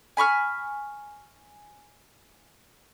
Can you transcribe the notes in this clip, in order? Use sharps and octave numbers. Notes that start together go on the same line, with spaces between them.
G#5 B5 C#6 F6